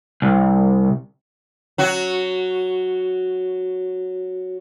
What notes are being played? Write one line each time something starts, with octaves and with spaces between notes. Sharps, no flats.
C2
F#3 F#4